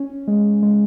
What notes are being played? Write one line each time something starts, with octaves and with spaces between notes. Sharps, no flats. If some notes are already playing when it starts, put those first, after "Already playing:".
Already playing: C#4
G#3
G#3